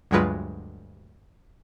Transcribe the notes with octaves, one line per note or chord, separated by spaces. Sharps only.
D2 G2 F#3 G#3 F4 B4